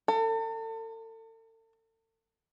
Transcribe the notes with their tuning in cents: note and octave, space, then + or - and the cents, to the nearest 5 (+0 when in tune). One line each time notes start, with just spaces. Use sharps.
A4 +40